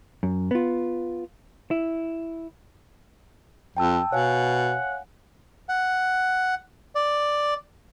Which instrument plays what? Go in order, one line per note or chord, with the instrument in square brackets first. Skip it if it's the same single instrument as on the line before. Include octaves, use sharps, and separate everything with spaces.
[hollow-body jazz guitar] F#2
B3 F4
E4
[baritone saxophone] F2 [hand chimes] G5 A5 E6
[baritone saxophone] B2 [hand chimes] C#5 F5 G#5 [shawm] F#5
[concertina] F#5
D5